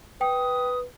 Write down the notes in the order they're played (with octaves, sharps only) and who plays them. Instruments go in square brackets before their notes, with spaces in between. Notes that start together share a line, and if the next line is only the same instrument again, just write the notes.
[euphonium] B4 [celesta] G5 [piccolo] D#6